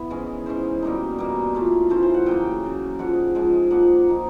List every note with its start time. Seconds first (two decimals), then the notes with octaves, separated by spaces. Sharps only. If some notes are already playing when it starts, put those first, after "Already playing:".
Already playing: B3 E4
0.10 G#2 E3 G#3 C#4
0.46 G#2 E3 G#3 C#4 C5
0.82 B2 G3 A#3 D#4
1.18 B2 G3 A#3 D#4
1.55 E3 A3 C#4 F4
1.90 E3 A3 C#4 F4 C5
2.03 C5
2.14 F#5
2.26 C#3 F#3 A#3 G5
2.62 C#3 F#3 A#3
2.99 G#2 F3 G#3 F#5
3.35 G#2 F3 G#3
3.71 F3 A#3 D#4 F#5
4.08 F3 A#3 D#4